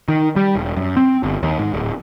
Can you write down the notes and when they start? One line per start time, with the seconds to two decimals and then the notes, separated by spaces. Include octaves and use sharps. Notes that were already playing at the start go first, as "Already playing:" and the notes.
0.08 D#3
0.36 G3
0.55 E1
0.76 F#2
0.97 C4
1.23 G1
1.43 D#2
1.59 G#2
1.74 D1